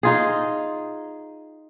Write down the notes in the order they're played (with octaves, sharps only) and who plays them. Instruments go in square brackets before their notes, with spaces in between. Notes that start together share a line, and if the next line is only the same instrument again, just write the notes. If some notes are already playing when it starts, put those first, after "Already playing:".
[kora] D#4 F4 G#4